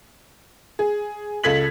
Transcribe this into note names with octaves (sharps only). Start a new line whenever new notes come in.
G#4
C#2 A4 G#6 B6 F#7